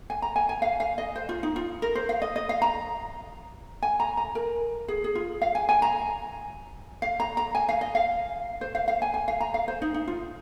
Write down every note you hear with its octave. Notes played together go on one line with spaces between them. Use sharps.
G#5
A#5
G#5
G#5
F5
F5
D#5
C5
F4
D#4
F4
A#4
C5
F5
D#5
D#5
F5
A#5
G#5
A#5
A#5
A#4
G#4
G#4
F4
F5
G#5
G#5
A#5
F5
A#5
A#5
G#5
F5
D#5
F5
C5
F5
F5
G#5
G#5
F5
A#5
F5
C5
D#4
D#4
F4